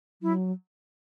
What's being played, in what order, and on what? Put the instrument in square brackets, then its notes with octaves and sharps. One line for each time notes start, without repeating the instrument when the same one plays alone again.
[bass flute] F#3 [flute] E4